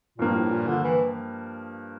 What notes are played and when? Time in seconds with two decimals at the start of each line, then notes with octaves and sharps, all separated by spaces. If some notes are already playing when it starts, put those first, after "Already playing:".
0.18 G2 A#2 F3 A#3
0.35 A2
0.51 A#2
0.67 D3
0.83 E3